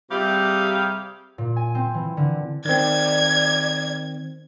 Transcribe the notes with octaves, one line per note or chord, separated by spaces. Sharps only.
C3 G3 G4 G#4 E5 F5
A#2
G#5
C4
E3
D3
D#3 C4 D5 G#6